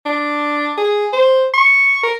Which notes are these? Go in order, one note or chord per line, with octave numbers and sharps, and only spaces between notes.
D4
G#4
C5
C#6
A#4